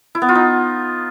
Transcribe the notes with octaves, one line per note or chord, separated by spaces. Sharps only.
E4
B3
F4
D#4